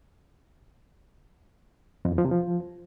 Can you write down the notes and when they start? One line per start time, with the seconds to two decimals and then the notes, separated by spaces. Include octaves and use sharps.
2.05 F2
2.12 E2
2.18 F3
2.25 C3
2.31 F3